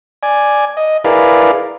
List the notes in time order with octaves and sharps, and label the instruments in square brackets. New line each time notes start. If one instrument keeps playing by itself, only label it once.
[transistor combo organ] D5 G#5
D#5
E4 G#4 A#4 B4 D5 F5